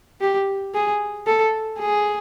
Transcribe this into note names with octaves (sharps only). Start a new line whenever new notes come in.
G4
G#4
A4
G#4